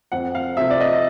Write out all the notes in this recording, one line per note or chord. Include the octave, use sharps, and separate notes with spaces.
F2 F#5
F5
C3 F3 E5
D5
D#5